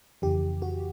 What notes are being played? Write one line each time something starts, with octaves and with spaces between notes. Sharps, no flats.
F2 C#3 E3 G4
F#4